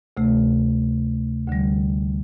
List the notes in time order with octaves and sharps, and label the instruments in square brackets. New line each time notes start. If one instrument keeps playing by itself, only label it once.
[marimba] D2 C3 A3
D2 D3 G3